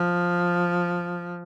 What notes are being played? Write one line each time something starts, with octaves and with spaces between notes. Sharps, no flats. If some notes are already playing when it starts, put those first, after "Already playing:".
Already playing: F3